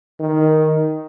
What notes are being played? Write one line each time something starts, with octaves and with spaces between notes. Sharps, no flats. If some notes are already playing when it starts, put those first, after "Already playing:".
D#3